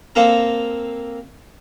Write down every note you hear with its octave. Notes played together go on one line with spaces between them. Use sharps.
A#3 C4 A4 F5 A#5